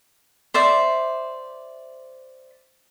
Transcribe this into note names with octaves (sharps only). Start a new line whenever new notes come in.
C5 D5 E5 D6